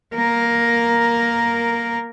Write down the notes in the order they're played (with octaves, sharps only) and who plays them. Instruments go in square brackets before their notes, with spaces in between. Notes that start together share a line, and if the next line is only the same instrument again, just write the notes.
[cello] A#3 A#4